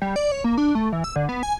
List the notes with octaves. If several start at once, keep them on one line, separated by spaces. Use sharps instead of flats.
G3
D5
C#5
A#3
D4
A3
E3
E6
D3
B3
G#5